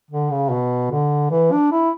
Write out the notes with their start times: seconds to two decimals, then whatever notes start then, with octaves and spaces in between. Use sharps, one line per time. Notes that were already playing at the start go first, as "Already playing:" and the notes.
0.11 D3
0.31 C#3
0.50 B2
0.91 D3
1.31 E3
1.52 D4
1.72 E4